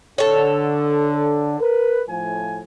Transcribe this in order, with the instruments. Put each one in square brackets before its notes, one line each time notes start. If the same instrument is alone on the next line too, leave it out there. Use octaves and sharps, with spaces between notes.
[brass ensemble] D3 [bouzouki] A4 C#5
[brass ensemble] A#4 B4
A2 F3 G#5